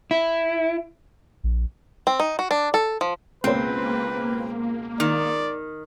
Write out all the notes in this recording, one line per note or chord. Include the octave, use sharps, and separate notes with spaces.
E4
A#1
C4
D#4
F#4
D4
A4
F3
C#2 B2 A#3 C4 B4 C5
D#3 D5